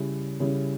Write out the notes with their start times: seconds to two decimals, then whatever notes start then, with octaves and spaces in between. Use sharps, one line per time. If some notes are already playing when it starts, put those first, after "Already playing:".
Already playing: C#3 G3 C#4 E4
0.40 C#3 G3 C#4 E4